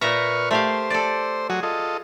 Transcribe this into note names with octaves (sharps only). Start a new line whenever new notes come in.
A#2 B4 E5 A#5 C#6 F6
A3 G4 C5 F5
A4 D5
F#3 F#4 G#4
F4 A4 D#5